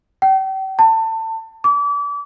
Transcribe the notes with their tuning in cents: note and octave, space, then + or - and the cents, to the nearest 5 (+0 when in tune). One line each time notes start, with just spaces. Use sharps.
G5 -35
A5 +25
D6 -35